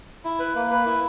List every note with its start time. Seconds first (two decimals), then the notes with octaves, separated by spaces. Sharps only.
0.25 E4
0.39 B4
0.55 A#3
0.71 B4
0.86 E4